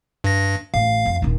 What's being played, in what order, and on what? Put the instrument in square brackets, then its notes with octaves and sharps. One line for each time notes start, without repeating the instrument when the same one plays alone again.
[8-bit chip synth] G2 A#6
[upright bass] A1 [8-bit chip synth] F5
[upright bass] F2
D#1 D#4